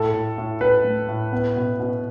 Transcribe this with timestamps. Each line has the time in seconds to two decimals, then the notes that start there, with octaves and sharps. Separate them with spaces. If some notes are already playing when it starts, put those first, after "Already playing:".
Already playing: A2 A4
0.14 A2
0.38 A2
0.61 A2 B4
0.84 A3
1.08 A2
1.33 B3
1.56 B2
1.80 B2